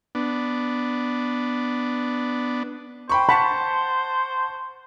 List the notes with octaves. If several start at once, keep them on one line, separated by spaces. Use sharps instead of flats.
B3 D4
C5 G5 B5 C#6
F#5 A5 B5 C#6